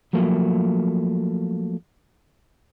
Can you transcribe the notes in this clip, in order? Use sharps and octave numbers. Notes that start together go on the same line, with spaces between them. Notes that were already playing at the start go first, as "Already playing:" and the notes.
F3 F#3 A3 A#3